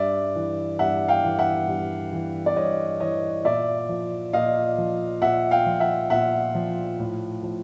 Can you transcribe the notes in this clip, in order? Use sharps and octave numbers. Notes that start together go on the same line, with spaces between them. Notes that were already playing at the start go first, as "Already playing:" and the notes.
Already playing: G2 D5 E5
E3
G2 E5 F#5
F5 G5
E3
E5 F#5
G2
E3
D5
G2 C#5 D#5
E3 C#5 D#5
A#2 D5 E5
F3
A#2 D#5 F5
F3
A#2 E5 F#5
F5 G5
F3
E5 F#5
A#2 E5 F#5
F3
A2
F3